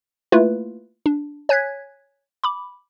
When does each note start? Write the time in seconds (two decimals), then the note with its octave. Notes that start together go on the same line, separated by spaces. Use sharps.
0.32 A3 A#3 E4 F4 B4
1.06 D4
1.49 C#5 G#5 F#6 G#6 B6
2.44 B5 D6